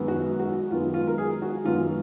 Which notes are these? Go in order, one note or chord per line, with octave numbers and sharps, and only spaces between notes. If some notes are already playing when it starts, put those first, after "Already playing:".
Already playing: F#2 D#3 G#3 B3
F#4
F#4
F#2 D#3 G#3 B3 F4
F4
A#4
G#4
F#4
F#2 D#3 G#3 B3 F4